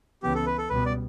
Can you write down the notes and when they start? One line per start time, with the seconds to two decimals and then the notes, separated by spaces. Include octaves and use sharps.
0.23 C#2 C#3 E3 B3 G4
0.35 A4
0.46 B4
0.58 A4
0.70 C#2 B2 G3 B3 B4
0.86 D5